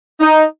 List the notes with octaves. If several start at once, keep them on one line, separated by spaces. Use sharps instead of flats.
D#4